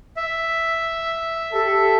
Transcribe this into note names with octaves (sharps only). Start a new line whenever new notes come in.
E5
G4 A4